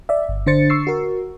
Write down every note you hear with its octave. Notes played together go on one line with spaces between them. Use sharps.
D5 E5
G1
D3 D4 C5 A6 C#7
C#6 E6 C7
F#4 A#4